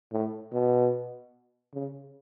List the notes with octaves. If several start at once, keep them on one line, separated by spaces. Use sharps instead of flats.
A2
B2
C#3